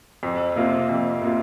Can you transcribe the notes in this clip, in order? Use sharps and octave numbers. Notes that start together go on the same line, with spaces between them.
F2
C3 A#3 F4
F2
C3 A#3 F4